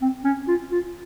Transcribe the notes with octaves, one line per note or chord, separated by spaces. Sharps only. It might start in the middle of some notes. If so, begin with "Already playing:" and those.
C4
C#4
F4
F4